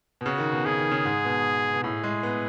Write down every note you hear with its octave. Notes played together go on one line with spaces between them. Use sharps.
B2
C#3 F#4
D#3
B2
C#3 G#4
D#3
C#3
G#2
B2
B2
A2 G#4
G#3
B3